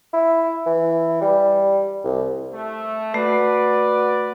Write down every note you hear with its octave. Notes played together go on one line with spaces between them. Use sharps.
E4
E3
G3
C2
A3
A3 F#4 B4 D5